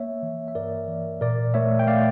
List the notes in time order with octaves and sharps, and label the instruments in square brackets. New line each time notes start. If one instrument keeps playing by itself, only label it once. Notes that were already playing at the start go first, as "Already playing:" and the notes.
Already playing: [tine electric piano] A#3 C#5 E5
E3
E5
G2 A#4 D5
E3
A#2 A#4 D5
A3 C#5 E5
G5
A3 D5 F5